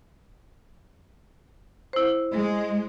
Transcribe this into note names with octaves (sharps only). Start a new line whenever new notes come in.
E4 C5
G#3